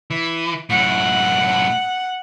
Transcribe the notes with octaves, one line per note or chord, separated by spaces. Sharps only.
E3
F#2 A2 F#5